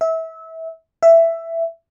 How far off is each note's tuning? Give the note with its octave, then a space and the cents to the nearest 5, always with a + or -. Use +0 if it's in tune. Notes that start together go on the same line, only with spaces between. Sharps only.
E5 -25
E5 +10